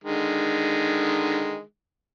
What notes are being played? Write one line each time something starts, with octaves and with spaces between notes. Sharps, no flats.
D3 D#3 G#3